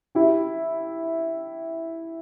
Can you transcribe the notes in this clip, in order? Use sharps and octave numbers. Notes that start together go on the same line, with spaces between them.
E4 G4